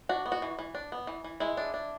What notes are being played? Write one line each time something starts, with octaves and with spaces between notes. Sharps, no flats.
D4 F#4
B3
F#4
E3
E3
D4
B3
E3
E3
G#3 E4
D4
D4